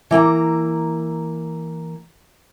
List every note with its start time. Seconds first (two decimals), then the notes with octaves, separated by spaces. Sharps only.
0.11 E3 A#3 G5 A#5